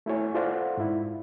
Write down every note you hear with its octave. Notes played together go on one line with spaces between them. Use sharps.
A3 E4 F#4 C#5 G#5
F4 A4 C5 D5 F5 F#5
G#2 E4